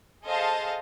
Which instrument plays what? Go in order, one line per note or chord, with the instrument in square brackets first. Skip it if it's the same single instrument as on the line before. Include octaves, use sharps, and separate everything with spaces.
[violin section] G#4 A4 C5 D#5 F5 A5